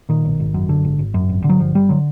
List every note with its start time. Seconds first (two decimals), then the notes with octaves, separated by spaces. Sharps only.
0.09 A#2 D#3
0.25 B1
0.40 G#1
0.54 F#2
0.69 D3
0.84 G#1
0.99 G#1
1.14 F#2
1.29 G#1
1.44 D3
1.49 F#3
1.60 G1 F3
1.75 G1 G3
1.89 D3 F#3